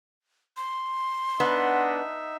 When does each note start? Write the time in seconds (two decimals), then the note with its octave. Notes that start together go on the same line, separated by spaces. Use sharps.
0.57 C6
1.40 B3 D4 D#4 D#5 E5 F#5